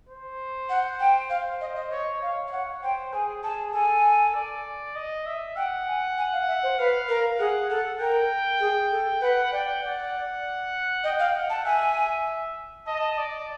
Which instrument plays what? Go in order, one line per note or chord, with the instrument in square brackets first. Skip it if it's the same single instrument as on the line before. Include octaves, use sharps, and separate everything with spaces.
[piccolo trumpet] C5
[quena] F#5
G5
[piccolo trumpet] C5 [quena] F5
[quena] D#5
D#5
[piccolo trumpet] C#5 [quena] D#5
[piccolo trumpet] C#5 [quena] F5
[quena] F5
[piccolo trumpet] C#5 [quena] F#5
[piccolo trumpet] C5 [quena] G5
[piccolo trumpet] G#4 [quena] G#5
[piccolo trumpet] G#4 [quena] A5
[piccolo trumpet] A4 [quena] G#5
[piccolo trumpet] D5
D#5
E5
[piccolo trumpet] F#5 [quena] G5
[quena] G#5
G#5
F5
E5
C5
[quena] B4 [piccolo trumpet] F5
[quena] A#4
[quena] G#4 [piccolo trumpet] F#5
[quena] A4 [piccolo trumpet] F#5
[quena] A#4 [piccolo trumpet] G5
[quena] G#4
A4
[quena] B4 [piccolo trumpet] F#5
[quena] D5 [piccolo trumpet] G5
[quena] D5 [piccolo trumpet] F#5
[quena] D#5 [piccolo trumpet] G5
[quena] F5
[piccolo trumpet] F#5
[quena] A5
[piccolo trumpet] E5 [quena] G#5
[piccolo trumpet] D#5 [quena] A5
[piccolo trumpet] D5